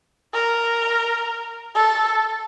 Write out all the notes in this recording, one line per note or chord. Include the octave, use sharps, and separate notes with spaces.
A#4
A4